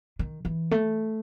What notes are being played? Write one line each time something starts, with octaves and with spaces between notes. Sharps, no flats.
D#3
E3
A3